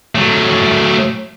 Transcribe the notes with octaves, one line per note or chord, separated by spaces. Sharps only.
F#3 A3